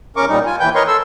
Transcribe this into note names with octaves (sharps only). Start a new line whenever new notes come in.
E2 C#4 A#4 C#6 D6
A#2 G3 D#4
F4 G#5
D#2 E3 B4 G5 G6
A#4 B4 C#5 D#5 C6 C#6
A4 C6 E6